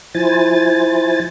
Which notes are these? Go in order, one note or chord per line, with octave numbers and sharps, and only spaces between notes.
F3 E4 C5 G#5 A6